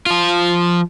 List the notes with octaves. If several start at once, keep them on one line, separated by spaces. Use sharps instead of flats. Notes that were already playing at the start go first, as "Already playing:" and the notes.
F3 F4